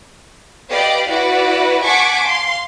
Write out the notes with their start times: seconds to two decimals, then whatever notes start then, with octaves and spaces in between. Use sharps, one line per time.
0.70 G4 B4 D5 D#5 F5
1.10 E4 F#4 B4 D5
1.84 F#5 G#5 A5 C#6 D6 B6
2.27 F5 C6